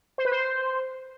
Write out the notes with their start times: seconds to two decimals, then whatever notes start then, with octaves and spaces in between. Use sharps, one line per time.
0.18 C5
0.25 B4
0.32 C5